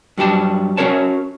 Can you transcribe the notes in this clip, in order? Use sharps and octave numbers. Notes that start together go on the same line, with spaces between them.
G2 F#3 G4 A5
C#4 F#4 A#4 C#5 A5